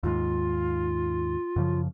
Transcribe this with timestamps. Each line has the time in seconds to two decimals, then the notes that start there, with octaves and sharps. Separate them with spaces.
0.03 D#2 G#2 F4
1.56 F#2 C#3 F3